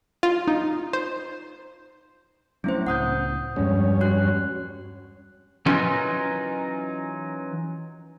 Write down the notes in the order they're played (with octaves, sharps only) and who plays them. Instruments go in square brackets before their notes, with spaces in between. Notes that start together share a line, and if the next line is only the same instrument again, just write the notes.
[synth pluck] F4
D#4
C5
[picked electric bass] F#3 A3 C4 [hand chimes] C#4 E4 C5
[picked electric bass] C#2 A2 [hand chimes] F#5 D#6 G6
[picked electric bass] E2 F3 G#3 [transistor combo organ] G2 C#4
[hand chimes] F#4 F#6
[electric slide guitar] E3 F#3 C#4 D#4 F4 A#4